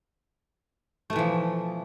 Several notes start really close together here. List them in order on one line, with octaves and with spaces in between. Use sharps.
A3 B2 E3 F3